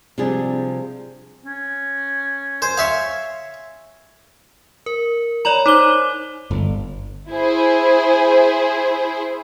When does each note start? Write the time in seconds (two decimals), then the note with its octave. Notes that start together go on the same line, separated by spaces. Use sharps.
0.18 C3 F3 G3 D4 G#4
1.46 C#4
2.62 C5 G#5
2.77 C#5 E5 F5
4.86 A#4
5.45 C#5 D5 A#5 B5 F#7
5.66 D#4 C5 D6 G7
6.51 G1
7.30 E4 G#4 C5